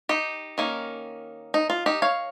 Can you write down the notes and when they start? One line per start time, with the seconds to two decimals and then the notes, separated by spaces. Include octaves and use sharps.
0.09 D#4 G4
0.58 D#3 A#3 C#4
1.54 D#4
1.70 F4
1.86 D#4 G4
2.02 C#5 F5